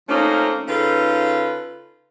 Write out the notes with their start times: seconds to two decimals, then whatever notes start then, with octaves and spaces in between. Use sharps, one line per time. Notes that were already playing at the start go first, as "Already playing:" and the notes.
0.09 F3 A3 A#3 C4 C#4 D#4
0.68 C#3 D#4 F4 A4 B4